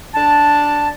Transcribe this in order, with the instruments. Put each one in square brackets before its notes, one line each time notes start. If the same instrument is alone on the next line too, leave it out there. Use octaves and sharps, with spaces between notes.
[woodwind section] D4 A5